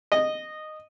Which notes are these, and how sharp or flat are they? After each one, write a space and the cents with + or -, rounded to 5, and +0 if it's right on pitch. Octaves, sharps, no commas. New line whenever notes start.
D#5 -10